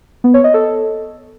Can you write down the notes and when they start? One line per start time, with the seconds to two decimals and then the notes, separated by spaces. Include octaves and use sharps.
0.24 B3
0.34 C#5
0.44 D#5
0.54 A4